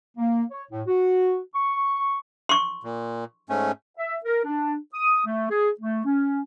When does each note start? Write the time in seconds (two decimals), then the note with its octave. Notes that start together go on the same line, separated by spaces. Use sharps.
0.18 A#3
0.51 C#5
0.71 A2
0.87 F#4
1.54 C#6
2.49 C6 C#6
2.83 A#2
3.49 G#2 A3 C#4
3.97 E5
4.24 A#4
4.45 D4
4.94 D#6
5.24 A3
5.50 G#4
5.79 A3
6.05 C#4